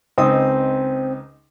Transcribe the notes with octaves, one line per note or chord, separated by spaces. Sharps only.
C#2 C4 D#4 D#6